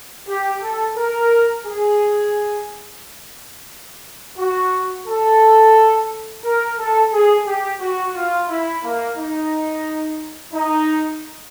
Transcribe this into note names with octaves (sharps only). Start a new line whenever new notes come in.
G4
A4
A#4
G#4
F#4
A4
A#4
A4
G#4
G4
F#4
F4
E4
A#3
D#4
D#4